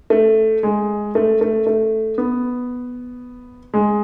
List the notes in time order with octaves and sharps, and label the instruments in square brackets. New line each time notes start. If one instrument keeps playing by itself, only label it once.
[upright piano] A3
G#3
A3
A3
A3
B3
G#3